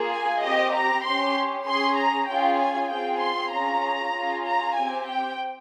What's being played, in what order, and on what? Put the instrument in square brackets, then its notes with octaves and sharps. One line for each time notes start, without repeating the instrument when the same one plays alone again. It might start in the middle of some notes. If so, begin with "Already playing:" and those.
Already playing: [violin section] A#3 F4 G#4
G#5
C4 G4 D#5
A#5
C#4 G4 C6
C#4 G#4 C6
A#5
C#4 F4 G#4 G5
G#5
C4 F4 G#4 G5
C6
C#4 F4 G#4 A#5
C#4 F4 G#4
A#5
C4 G4 G#5
G5